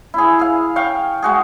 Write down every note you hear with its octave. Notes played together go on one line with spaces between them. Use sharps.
E4 G#4
G#4 F5
F5 G5 C#6
G#3 F#4 G#4